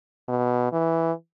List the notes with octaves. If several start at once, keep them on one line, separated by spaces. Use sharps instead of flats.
B2
E3